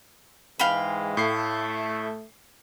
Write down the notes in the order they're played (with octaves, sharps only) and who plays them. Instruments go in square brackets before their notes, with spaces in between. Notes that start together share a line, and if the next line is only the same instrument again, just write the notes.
[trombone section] G#2 E3 G#3 [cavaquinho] F5 G5 B5
[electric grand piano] A2 C7 [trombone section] A3